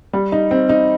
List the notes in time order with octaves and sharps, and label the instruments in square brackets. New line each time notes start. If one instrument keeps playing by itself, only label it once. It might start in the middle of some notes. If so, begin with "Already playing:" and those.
[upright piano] G3
D#4
C4
D#4